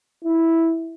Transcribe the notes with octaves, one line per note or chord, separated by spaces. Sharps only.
E4